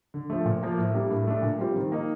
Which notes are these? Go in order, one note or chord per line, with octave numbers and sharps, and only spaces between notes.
D3
F3 A3
A#2
F3 A#3
A2
G3 A#3 D4
A2
A3 D4
A#2
G3 C4 F4
D#3
A#3 D#4